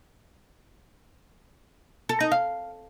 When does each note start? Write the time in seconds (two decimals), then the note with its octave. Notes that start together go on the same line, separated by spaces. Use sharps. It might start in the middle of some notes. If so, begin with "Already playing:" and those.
2.09 A4
2.20 D#4
2.32 F5